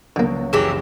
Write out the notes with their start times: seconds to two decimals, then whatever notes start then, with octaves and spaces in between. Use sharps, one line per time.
0.16 C#2 D3 F#3 A#3
0.53 F#1 E3 F#3 G4 G#4 G#5 A#6